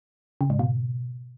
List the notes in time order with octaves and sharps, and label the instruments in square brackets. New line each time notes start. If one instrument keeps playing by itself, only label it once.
[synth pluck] C#3
G#2
B2